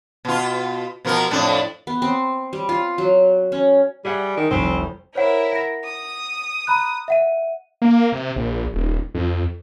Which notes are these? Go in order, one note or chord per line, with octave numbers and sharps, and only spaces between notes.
B2 F4
B2 F3 A#4
F2 A2 D4
B3
C4
G3
F4
F#3
C#4
G3 G#4 E5 F#5
D#3
F1 C2 C4
E4 A#4 C5 C#5 F#5
F#5 A#6
D#6
A#5 B5 F#6
E5 F#5 D#7
A#3
C3
A#1
D#1
F2